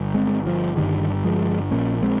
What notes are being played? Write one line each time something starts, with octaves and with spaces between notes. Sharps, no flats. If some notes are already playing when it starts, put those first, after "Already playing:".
Already playing: G1
G#3 C4
F3
G1 G2 D#3 G3
F3 G#3
A#1 A#2 A#3 C#4
G#3 C4